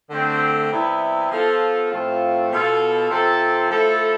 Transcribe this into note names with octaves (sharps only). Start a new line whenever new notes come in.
D3 A3 C4
C3 G3 B3 E4
F3 B3 F4 A4
A2 F3 A3 C4 F4
B2 B3 F4 A4
C3 F3 C4 F4 A4
F3 A3 E4 A4